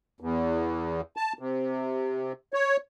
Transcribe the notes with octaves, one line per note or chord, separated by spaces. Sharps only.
E2
A5
C3
C#5